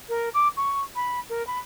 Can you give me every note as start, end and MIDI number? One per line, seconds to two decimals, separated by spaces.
0.09 0.29 70
0.34 0.48 86
0.57 0.81 85
0.96 1.20 83
1.30 1.45 70
1.47 1.59 83